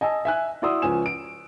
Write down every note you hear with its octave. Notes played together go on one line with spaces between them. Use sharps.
D#5 G#5 A5 E6
E5 G#5 F#6
E4 F#4 D5 C6 D#6 E6
C#2 F3 C#4 G#5 E7
D7